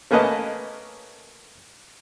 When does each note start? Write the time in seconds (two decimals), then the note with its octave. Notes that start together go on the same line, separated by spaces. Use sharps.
0.11 A3 A#3 C#4 B4 D#5 A5